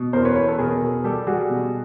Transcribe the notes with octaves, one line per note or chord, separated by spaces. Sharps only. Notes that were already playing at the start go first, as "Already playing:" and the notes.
Already playing: B2
E2 A#4 C5
B4 C#5
E2 B4 C#5
A4 B4
B2 G#4 A#4
B2
G3 G4 A4
G3 F#4 G#4
B2